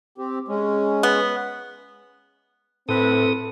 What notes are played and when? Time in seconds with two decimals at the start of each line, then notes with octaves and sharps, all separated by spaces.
0.18 C4 G4
0.48 G#3 C#4
1.03 B3
2.89 A2 C4 A4 B4 D#6